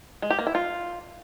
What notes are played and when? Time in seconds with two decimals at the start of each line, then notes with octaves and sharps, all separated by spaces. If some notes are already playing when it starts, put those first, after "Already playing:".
0.22 G#3
0.30 G4
0.39 A#3
0.47 E4
0.55 F4